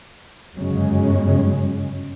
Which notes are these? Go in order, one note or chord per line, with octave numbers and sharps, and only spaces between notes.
G1 F#2 C#3 F#3 G#3 C#4